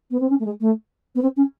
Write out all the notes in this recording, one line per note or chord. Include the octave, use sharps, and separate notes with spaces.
B3
C4
C#4
A3
G#3
A3
B3
C4
C#4